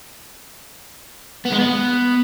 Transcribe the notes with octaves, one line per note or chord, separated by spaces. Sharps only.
B3
G#3
B3